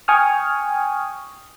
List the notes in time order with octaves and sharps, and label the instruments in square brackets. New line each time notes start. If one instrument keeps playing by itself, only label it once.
[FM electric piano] G5 G#5 C#6 D#6 F6